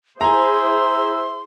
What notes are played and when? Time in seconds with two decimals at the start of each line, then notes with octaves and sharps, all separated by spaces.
0.21 E4 G#4 C5 E5 G#5 A#5 C6